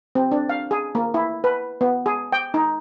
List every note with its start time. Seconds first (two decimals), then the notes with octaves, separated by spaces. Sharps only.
0.15 C4
0.32 D4
0.49 F5
0.71 G#4
0.95 A#3
1.14 E4
1.44 B4
1.81 B3
2.06 G#4
2.32 G5
2.54 D#4